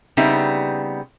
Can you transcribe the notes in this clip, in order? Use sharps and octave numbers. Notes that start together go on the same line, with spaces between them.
C#3 G3 B3 C4 D#4 E5